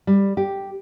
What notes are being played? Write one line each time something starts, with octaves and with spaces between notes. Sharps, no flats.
G3
G4